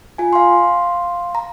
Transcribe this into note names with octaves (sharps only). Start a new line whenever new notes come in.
F4 G#5
F5 C6
A#5